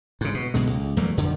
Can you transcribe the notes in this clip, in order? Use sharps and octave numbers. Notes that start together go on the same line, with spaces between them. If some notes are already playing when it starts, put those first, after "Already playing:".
G#2 C#3
B2
B1 B2 D3 G#3
C#2
E2 F#3 A3 A#3
F2 D3 D#3